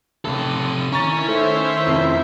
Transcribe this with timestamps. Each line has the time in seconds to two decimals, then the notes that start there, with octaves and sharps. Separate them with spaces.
0.25 A1 C3 A4 D#7
0.92 D#3 C#4 E4 A#5 C#6 A6
1.28 A3 C5 E5
1.86 F1 F2